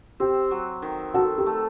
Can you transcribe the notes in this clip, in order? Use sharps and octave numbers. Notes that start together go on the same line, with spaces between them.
C4 G4
F#3
D#3
F#4 A4
G4
A3